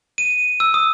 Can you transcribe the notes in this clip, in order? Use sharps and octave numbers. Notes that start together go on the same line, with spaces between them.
D#7
E6
D#6